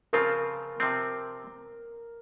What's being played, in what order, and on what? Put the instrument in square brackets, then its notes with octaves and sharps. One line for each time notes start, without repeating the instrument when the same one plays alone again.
[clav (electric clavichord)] C#3 F3 C4 F4 [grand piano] A#4
[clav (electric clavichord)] C3 F3 C4